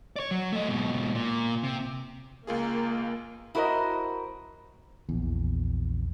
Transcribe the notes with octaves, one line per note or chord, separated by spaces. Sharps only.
C#5 D5
F#3
A3 D#5
G#2 B2
A#2
C3
C#2 A#3 F4 G#4
E4 F#4 A#4 C5 D#5
A#1 E2